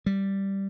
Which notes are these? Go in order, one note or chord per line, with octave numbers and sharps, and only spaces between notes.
G3